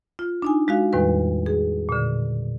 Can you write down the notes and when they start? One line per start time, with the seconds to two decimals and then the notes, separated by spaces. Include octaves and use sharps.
0.19 F4
0.42 D4 D#4 G#5
0.68 G#3 F#4 F5
0.93 E2 A2 D#3 G3 B4
1.46 G#4
1.89 A#2 D3